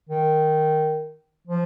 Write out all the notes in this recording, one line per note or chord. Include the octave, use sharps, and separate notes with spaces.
D#3
F3